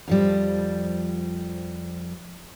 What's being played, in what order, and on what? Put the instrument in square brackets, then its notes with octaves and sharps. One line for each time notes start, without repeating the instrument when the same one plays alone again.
[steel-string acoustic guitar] F2 F3 G3